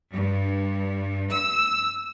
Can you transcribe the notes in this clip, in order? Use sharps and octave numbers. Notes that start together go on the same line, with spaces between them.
G2
E6